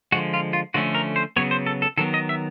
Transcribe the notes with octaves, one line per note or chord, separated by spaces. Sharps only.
D3 F3 G#3 F#4
F4
F4
D3 F3 A3 C#4 F#4
A#4
C5
C#3 F#3 B3 C#5
C5
A4
A4
D#3 F#3 B3 A4
D#5
E5